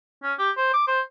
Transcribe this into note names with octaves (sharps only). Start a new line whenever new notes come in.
C#4
G4
C5
D6
C5